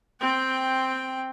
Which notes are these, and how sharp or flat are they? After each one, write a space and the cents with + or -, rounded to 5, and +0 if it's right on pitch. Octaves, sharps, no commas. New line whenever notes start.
C4 +0 G5 +5